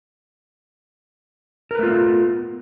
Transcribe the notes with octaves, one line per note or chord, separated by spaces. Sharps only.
A3 B3 F4 A#4 B4